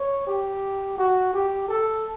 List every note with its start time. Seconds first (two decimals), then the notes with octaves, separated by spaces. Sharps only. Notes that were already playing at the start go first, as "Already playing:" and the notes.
Already playing: C#5
0.27 G4
0.98 F#4
1.34 G4
1.69 A4